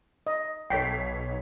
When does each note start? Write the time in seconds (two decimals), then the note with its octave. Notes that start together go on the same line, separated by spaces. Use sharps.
0.27 D#5
0.70 B1 A4 C#5 G5 B6 C7